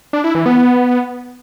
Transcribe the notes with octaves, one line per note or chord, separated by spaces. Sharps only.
D4
E4
E3
B3